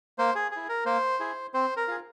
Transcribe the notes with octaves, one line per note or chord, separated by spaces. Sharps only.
A#3 C5
G#4
E4 G#4
A#4
A#3 C5
E4 G#4
C4 C5
A#4
F4 G#4